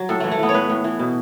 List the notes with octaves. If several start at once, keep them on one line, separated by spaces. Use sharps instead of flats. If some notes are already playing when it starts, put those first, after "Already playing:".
Already playing: F#3
A2 A4
E3 A3
A3
E3 B3
C#5
A2 B4
A2
E3
B2